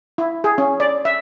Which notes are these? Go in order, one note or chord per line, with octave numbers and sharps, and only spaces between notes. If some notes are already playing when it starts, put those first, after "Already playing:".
E4
G#4
C#4
D5
E5